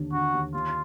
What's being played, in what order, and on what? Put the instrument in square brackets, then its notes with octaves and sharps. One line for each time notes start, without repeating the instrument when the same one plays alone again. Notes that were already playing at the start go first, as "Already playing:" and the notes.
Already playing: [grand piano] D#2 D3
[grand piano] D3 [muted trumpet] F#4
[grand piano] D#2
[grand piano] D#2 [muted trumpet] F4